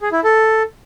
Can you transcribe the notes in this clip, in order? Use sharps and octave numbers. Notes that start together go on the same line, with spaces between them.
G#4
E4
A4